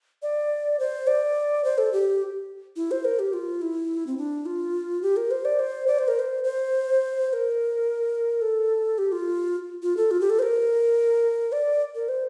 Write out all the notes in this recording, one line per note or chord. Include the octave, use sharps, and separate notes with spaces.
D5
C5
D5
C5
A4
G4
E4
C5
A#4
G4
F4
E4
C4
D4
F4
G4
A#4
C5
D5
C5
D5
C5
A#4
C5
C5
C5
A#4
A4
G4
F4
F4
A4
F4
G4
A4
C5
A#4
D5
A#4
C5